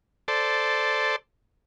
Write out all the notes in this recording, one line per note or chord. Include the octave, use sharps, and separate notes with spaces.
A4 C5 D5